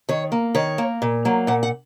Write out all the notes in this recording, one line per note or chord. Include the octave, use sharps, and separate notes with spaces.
D#3 C#5
A#3
D#3 C#5
A#3
A#2
F#3 A#3
A#2 F#5
F#5